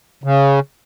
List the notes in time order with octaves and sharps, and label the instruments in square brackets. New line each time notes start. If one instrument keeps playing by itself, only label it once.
[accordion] C#3